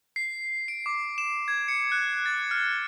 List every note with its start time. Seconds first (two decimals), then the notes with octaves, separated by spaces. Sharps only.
0.16 C7
0.68 D7
0.86 D6
1.18 E7
1.48 G#6
1.68 C#7
1.92 F#6
2.26 A6
2.51 F6